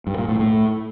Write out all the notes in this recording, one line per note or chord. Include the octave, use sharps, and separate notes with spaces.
G2
A#2
A2
A2